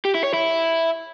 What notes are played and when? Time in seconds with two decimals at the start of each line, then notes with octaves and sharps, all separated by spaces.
0.05 G4
0.14 E4
0.24 C#5
0.34 E4